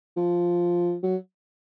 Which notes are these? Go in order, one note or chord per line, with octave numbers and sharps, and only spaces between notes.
F3
F#3